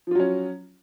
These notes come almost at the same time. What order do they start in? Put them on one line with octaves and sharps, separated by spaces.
F3 F4 F#3 C#4